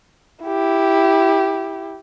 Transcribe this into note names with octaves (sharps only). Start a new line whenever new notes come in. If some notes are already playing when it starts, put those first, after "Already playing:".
E4 G4